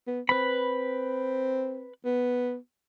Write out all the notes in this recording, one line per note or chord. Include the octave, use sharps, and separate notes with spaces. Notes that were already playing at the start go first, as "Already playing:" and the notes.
B3
C4 B4 B5
B3